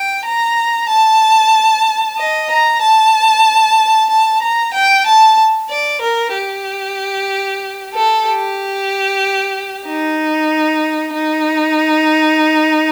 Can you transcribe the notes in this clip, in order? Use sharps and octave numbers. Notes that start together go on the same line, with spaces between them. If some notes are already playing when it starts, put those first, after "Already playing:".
Already playing: G5
A#5
A5
D#5
A#5
A5
A5
A#5
G5
A5
D5
A#4
G4
A4
G4
D#4
D#4